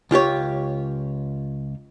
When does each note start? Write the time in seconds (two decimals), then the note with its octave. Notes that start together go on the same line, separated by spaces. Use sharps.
0.11 C#2 F4 G4 C#5